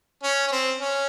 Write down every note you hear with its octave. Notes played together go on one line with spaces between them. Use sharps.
C#4
C#4
C4
C#4